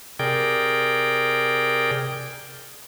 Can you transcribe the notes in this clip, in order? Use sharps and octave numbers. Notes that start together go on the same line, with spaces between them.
C3 G#4 A#4 D5 G5